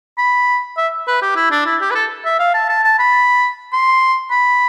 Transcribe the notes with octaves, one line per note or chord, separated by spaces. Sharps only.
B5
E5
B4
G4
E4
D4
E4
G4
B4
A4
E5
F5
A5
A5
A5
B5
C6
B5